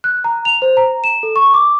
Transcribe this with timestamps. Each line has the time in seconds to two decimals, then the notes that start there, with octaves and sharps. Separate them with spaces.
0.04 F#6
0.24 A#5
0.45 F7
0.62 C5
0.77 A#5
1.04 E7
1.23 A4
1.36 C#6
1.54 D6